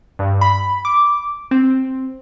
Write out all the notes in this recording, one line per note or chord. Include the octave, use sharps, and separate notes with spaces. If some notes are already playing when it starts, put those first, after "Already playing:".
G2
B5
D6
C4